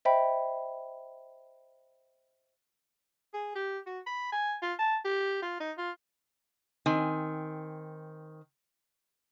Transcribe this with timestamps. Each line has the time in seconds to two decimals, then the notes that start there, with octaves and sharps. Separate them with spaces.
0.05 C5 D#5 E5 G5 B5
3.34 G#4
3.55 G4
3.86 F#4
4.06 B5
4.32 G#5
4.62 F4
4.79 A5
5.04 G4
5.42 F4
5.60 D#4
5.78 F4
6.86 D#3 C4 G#5